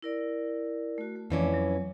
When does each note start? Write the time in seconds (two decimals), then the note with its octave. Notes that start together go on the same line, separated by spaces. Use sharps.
0.02 E4 A#4 D5
0.98 A3 F#4
1.16 A3
1.30 F2 E3 A3 C#4 D5 D6
1.54 F#3